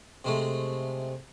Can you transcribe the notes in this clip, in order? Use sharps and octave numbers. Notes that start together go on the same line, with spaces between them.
C3 G#3 A3